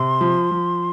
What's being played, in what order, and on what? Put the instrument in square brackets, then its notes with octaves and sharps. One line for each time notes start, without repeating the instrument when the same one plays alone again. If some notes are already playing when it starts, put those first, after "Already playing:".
Already playing: [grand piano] C3 [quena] C6
[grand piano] F3
F3